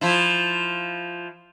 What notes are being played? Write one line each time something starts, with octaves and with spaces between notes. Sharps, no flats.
F3 E4